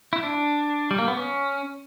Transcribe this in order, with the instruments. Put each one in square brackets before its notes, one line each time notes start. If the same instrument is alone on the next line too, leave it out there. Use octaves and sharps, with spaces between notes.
[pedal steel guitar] E4
D4
G3
A#3
B3
C#4